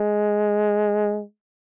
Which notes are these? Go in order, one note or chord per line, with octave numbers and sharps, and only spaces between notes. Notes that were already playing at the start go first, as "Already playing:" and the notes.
Already playing: G#3